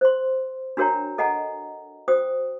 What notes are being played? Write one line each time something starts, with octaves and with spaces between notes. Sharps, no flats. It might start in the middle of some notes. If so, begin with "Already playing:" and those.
C5 C6
D4 F#4 A#4 C#5 G5 A#5
A4 D#5 F#5 G#5 A#5
F#4 C5 G5 D#6